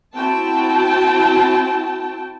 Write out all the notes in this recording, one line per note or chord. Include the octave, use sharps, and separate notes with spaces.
C4 E4 F#4 G5 A5